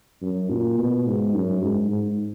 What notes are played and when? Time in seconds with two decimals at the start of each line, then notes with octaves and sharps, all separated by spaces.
0.22 F#2
0.50 A#2
0.78 B2
1.07 G#2
1.34 F#2
1.62 G#2
1.91 G#2